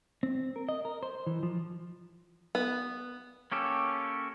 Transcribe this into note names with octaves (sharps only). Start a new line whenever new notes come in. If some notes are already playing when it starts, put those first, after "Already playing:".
C4
A#4
D#5
A#4
C5
E3
F3
B3
A#3 C#4 G4 A4